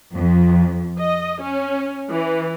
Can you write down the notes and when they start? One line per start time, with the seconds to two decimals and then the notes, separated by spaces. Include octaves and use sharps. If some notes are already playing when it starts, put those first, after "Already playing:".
0.14 F2
0.99 D#5
1.41 C#4
2.09 E3